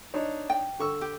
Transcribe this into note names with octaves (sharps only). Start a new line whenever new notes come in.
D4 D#4 C#5
G5
D3 C#6 E6
G4